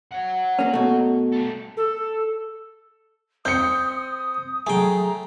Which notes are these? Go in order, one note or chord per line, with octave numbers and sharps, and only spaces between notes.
C#5 F#5
A#3 C#4
B2 A3
G3 A4
A4
C4 D#6 G6 C#7
F#3 A3 G#4 G5 G#5 A#5